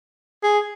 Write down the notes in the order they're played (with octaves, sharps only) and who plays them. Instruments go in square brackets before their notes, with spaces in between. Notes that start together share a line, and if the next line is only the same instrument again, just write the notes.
[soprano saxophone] G#4